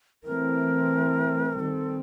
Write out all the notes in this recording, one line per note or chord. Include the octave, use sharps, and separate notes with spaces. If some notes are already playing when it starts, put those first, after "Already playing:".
E3 A3 C4 A#4
D#3 G3 C4 A4